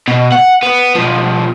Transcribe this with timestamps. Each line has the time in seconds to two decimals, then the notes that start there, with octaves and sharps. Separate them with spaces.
0.08 B2
0.32 F#5
0.63 B3
0.96 B2 F3